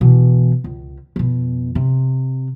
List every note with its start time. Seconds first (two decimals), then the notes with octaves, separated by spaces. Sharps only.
0.01 B2 E3
0.64 C#2
1.16 F2 B2
1.75 C3